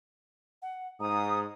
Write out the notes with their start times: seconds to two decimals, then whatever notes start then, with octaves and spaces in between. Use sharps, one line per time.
0.62 F#5
1.00 G#2 A#5 D#6